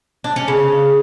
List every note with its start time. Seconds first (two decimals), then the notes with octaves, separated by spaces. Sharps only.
0.24 D4
0.36 C#4
0.48 C#3